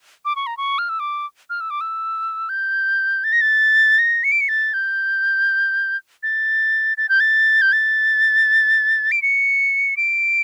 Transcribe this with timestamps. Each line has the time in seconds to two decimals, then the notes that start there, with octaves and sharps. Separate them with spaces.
0.25 D6
0.36 C#6
0.46 A#5
0.57 C#6
0.78 F6
0.89 E6
1.00 D6
1.50 F6
1.60 E6
1.70 D6
1.81 E6
2.49 G6
3.24 A6
3.32 A#6
3.41 A6
3.99 A#6
4.24 C#7
4.32 D7
4.40 C#7
4.48 A6
4.73 G6
6.23 A6
6.97 A6
7.09 G6
7.20 A6
7.61 G6
7.72 A6
9.11 D7
9.22 C#7
9.97 D7